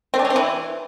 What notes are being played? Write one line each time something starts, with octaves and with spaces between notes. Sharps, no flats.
C4
D4
C#4
C4
E3